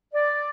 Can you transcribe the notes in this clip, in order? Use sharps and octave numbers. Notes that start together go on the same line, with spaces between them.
D5